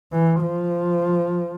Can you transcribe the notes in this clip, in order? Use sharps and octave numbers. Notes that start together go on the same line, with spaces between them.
E3
F3